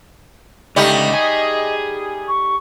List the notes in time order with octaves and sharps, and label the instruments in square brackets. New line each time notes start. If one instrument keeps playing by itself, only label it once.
[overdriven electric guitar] C#2 D3 [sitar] G3 A3 D#4 [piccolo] D#5
[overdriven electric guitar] G#4
[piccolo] C#6